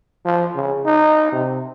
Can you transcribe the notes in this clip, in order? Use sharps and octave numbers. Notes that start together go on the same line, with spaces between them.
F3
C#3
D#4
C3